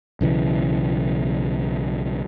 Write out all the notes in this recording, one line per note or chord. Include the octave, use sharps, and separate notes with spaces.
B1 C#3 E3